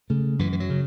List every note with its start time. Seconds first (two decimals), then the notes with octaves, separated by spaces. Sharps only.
0.10 C#3 A3
0.39 F#2 E3
0.53 E3
0.60 F#3
0.70 C#3